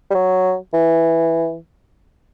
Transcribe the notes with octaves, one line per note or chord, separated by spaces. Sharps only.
G3
F#3
E3